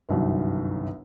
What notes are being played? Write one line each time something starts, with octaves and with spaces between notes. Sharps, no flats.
G1 C2 F#2 D#3